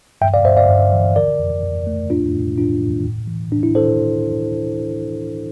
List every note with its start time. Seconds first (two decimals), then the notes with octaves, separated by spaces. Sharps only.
0.21 G2 E5 G5
0.34 D5 F5
0.45 G2 C5 E5
0.57 D5 F5
0.69 G2
0.92 E3
1.16 D3 A#4 D5
1.39 F2
1.63 F2
1.87 A3
2.10 A2 D4 F4
2.34 A2
2.57 A2 D4 F4
2.81 A2
3.05 A2
3.28 E3
3.52 A2 D4
3.63 E4
3.75 A2 A4 C5